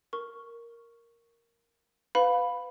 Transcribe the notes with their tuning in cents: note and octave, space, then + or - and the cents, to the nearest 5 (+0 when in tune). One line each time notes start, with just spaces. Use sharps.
A#4 +0 C#6 +0
B4 +30 F5 +20 B5 +0